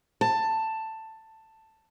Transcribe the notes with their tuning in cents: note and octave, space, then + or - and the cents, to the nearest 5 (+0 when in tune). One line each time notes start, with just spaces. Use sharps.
A5 +10